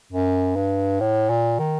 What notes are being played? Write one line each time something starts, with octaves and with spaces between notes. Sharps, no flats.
F#2
G2
A2
A#2
D#3